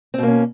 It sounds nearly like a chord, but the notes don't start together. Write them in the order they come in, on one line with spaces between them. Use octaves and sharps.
C4 B2 A#3 C#4